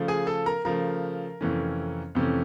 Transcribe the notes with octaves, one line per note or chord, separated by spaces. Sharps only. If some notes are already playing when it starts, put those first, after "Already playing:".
Already playing: C#3 F3 A3
G#4 G#5
A4 A5
A#4 A#5
C#3 F3 A3 A#4 A#5
F2 C3 E3 A3 C#4
F2 C3 E3 A3 C#4